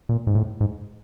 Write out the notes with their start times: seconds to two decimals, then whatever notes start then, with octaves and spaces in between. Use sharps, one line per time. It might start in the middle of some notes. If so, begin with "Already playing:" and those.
0.09 A#2
0.27 G#2
0.35 A2
0.61 G#2